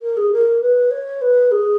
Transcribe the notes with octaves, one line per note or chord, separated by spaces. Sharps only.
A#4
G#4
A#4
B4
C#5
B4
G#4